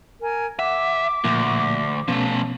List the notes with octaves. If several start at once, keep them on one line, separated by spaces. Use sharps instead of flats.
A#4 G#5
E5 F#5 D6
D2 A#2 F3 A#3
B2 F3 A3 B3 C#4